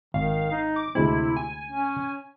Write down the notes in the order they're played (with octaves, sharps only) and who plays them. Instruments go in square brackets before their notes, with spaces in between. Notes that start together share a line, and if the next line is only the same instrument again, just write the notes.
[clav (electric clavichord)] G#1 [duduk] D#3 [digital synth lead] F5
[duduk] D#4
[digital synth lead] D6
[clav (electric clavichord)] D2 G#3 C4 [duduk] C3 [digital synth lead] E4
[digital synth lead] G#5
[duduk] C#4